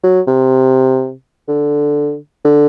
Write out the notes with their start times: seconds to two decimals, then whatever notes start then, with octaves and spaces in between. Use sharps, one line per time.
0.04 F#3
0.28 C3
1.48 D3
2.45 D3